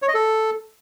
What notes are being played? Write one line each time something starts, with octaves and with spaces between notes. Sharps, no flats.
C#5
D#5
A4